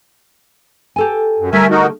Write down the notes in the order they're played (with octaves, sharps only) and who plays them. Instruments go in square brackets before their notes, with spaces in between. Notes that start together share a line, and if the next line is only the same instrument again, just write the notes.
[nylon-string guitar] G4 A4 G#5
[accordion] F#2
[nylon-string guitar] D3 G3 A3 [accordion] A#4 E5 G#5
[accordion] D#4 F#4 A#4